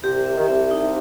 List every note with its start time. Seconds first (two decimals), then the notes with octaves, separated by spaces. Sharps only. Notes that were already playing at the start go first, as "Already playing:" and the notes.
0.03 C2 C3 G4
0.26 E5
0.37 D#3
0.48 C2 C3 E5
0.71 D#4